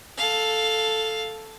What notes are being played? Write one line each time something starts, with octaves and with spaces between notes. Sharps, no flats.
A4 F5